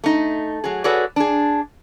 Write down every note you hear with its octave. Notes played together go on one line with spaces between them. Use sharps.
A3 D#4
F#3 G#4
F#4 G#4 A4 B4 C#5 D5
D4 G#4